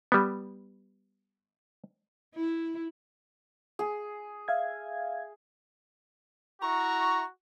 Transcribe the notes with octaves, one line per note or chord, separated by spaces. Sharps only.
G3 B3
E4
G#4
E5 F5 G#6
E4 F#4 A#5 C#6